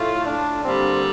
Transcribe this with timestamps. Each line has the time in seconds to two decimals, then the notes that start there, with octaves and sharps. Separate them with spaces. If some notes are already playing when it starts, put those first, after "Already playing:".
Already playing: A2 A3 F4
0.26 D4
0.65 D3 G3 A#3 C4